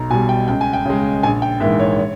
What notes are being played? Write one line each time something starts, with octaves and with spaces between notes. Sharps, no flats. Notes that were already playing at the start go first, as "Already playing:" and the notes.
Already playing: B1 A#5
B2 G3 G#5
G5
C#2 G5
G#5
G5
C#3 G#3
A#1 G#5
G5
G#2 E3 A#3 E5
C#5
C#5